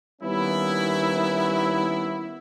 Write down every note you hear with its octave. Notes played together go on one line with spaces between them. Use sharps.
D#3 G3 A#3 B3 C#4 E4